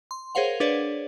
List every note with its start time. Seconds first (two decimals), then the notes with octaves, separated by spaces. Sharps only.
0.11 C6
0.35 G#4 A#4 C5 C#5 F5 F#5
0.60 D4 G#4 B4 C#5 D5